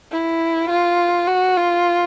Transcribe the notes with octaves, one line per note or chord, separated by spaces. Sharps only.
E4
F4
F#4
F4